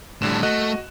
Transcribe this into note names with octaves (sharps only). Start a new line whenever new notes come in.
F2 A2 D3 G3 E7
A3 F#4 D#5 F#6